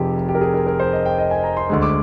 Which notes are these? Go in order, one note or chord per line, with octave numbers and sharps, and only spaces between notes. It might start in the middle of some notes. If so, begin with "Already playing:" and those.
Already playing: F1 F2 C3 G4 G#4
G4
A#4
G#4
A#4
A#4
C5
D#5
G5
D#5
G#5
A#5
C6
D2 D3 G#3 C6
D6